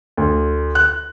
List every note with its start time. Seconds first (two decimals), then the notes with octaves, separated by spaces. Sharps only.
0.17 D2
0.75 F#6